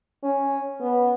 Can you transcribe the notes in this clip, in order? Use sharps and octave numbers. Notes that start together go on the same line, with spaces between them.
C#4
B3